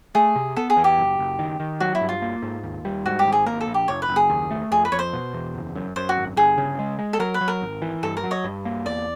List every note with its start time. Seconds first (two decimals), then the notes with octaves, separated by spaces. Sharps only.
0.15 A3 G#4
0.36 C3
0.56 B3 A4
0.70 G#4
0.77 E2
0.84 G4
0.98 F#1
1.19 F#1
1.39 D#3
1.60 D#3
1.80 F#3 F#4
1.95 E4
2.01 G2
2.09 F4
2.22 A#3
2.42 G#2
2.63 D#2
2.85 G3
3.06 G#2 F#4
3.19 G4
3.25 G#1
3.32 G#4
3.46 A#3 A#4
3.61 A4
3.67 A#1
3.74 G4
3.88 F#1 C#5
4.02 B4
4.08 F#1
4.16 G#4
4.29 D#2
4.51 A3
4.71 F2 G#4
4.85 B4
4.92 F2 C#5
4.99 C5
5.13 B2
5.34 E2
5.54 F#1
5.75 F#2
5.96 F#2 C5
6.09 F#4
6.16 G#1
6.36 G1 G#4
6.58 C#3
6.79 G#3
6.99 G#3
7.13 A4
7.19 F#3 A#4
7.34 B4
7.41 F#3
7.48 A#4
7.62 G#1
7.82 E3
8.03 G2 A4
8.17 A#4
8.24 F#3
8.31 C#5 D#5
8.44 G2
8.65 A#3
8.86 E2 D5